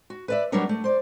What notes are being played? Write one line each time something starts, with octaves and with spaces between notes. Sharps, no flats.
F#4
B4 D5 E5
F#3 G3 B3 D4 A#4 C#5
A3
C5 D5